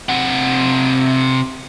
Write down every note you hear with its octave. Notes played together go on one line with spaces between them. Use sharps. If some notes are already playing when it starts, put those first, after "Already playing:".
C3 F#5